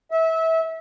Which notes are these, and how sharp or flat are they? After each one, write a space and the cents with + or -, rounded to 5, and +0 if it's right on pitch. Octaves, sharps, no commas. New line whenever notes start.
E5 -25